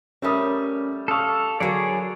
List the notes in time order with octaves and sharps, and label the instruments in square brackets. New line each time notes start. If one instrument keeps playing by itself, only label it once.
[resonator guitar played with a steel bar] G3 A3 C4 [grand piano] C#4 A#4 D#6
[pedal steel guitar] A4 F5 [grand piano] C#6 D#6 E6
[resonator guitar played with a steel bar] D3 A#3 [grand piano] F#3 [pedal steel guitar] G#4 C#5 D5